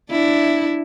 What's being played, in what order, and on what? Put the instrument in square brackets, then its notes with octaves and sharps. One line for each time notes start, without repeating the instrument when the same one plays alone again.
[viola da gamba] D4 E4